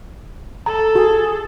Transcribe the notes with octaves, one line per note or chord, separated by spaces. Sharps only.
A4 A#5
F#4 G#4